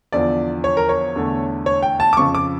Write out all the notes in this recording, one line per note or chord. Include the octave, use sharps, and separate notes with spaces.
E2 D3 F3 D5
C#5
A#4
C#5
E2 D3 A3
C#5
G5
A5
D6
F2 C#3 F3 C#6
D6